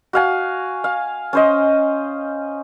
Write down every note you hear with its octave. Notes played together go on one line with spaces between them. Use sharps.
F#4 F5 G#5
F5
C#4 C5 D#5